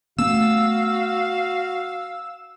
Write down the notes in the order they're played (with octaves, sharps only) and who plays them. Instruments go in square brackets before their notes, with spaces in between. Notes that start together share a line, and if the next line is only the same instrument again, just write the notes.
[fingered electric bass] A3 B3 [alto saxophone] F#4 [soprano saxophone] F5 [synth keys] E6